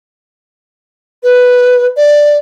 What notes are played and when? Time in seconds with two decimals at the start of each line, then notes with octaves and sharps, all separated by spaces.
1.23 B4
1.97 D5